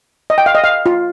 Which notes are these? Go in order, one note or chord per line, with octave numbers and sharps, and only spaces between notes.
D#5
G5
F5
D#5
F5
F4